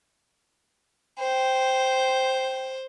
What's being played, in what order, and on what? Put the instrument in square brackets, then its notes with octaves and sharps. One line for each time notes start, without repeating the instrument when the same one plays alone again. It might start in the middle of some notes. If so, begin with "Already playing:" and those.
[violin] C5 [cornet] G5